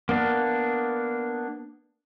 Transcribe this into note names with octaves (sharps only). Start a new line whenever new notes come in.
A#3 B3 D4